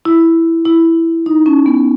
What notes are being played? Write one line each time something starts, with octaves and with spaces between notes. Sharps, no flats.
E4
E4
D#4
C#4
B3